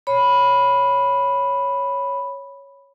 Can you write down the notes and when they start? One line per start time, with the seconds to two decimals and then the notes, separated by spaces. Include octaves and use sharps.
0.07 C#5 B5